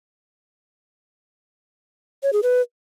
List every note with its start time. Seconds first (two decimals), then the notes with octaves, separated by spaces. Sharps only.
2.23 C#5
2.33 G#4
2.43 B4